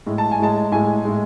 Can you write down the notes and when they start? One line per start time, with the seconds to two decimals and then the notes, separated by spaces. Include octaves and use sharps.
0.06 A2 G#3
0.18 A5
0.31 G#5
0.39 A2 G#3 A5
0.72 A2 G#3 G#5
1.05 A2 G#3